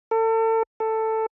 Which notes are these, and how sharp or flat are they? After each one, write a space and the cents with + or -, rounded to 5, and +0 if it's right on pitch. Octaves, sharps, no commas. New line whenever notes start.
A4 +35
A4 +10